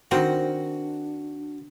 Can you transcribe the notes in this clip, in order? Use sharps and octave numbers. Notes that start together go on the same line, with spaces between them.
D#3 C4 D4 F#4 A#4